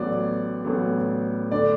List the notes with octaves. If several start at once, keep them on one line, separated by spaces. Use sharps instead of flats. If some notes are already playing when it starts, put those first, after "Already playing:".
Already playing: A1 A2 F#3 B3 D5
A1 A2 F#3 B3
D3 A3 D5